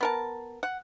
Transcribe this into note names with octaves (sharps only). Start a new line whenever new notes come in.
B3 A#4 A5
F#5